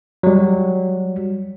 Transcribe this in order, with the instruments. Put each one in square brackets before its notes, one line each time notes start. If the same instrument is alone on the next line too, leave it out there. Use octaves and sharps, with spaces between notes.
[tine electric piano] F#3 G3